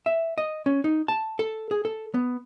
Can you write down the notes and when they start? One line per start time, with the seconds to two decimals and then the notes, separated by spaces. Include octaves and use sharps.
0.06 E5
0.38 D#5
0.66 C#4
0.84 D#4
1.08 A5
1.39 A4
1.71 G#4
1.85 A4
2.14 B3